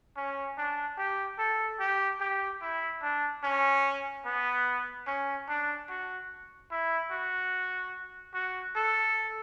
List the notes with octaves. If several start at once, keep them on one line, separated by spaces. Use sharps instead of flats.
C#4
D4
G4
A4
G4
G4
E4
D4
C#4
B3
C#4
D4
F#4
E4
F#4
F#4
A4